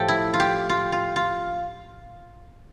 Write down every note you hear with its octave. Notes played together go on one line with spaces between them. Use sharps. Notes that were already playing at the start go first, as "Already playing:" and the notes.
Already playing: A2 F3 A3 G4 A4
E4
F4
G4
F4
F4
F4